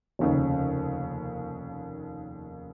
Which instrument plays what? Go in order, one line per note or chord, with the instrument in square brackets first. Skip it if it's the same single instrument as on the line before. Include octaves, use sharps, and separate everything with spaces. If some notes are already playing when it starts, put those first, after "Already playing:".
[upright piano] F1 D#2 C#3